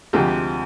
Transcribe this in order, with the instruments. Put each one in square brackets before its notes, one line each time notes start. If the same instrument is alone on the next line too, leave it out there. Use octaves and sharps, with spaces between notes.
[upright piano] D2 C3 F3 G#3 G4